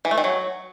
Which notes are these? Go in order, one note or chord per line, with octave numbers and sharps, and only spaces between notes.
E3
A3
D#3
F#3